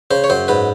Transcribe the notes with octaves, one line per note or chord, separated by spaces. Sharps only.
C#3 C5
C#5
F#2 C5
G#2 B4